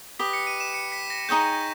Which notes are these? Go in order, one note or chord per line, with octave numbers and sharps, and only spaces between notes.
G4 B4 D#5 B6
C#7
D#7
E7
C#7
B6
A#6
D#4 G#4 C#5 G5 G6